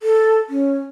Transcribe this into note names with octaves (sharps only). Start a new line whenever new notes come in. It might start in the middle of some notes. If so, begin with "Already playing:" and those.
A4
C#4